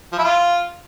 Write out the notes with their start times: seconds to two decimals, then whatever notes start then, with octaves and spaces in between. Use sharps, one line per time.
0.12 F3
0.18 E4
0.24 F4